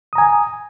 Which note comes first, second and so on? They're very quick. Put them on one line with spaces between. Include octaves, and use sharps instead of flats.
D#6 A#5 G#5